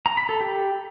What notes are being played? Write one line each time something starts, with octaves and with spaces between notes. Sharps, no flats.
A#5
B5
A4
G4